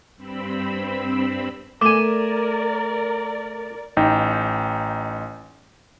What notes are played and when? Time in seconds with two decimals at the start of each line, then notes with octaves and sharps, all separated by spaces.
0.16 G2 C4 B5 E6
1.81 A3 A#4 D5 G#5 D6
3.97 A1 D#4 G5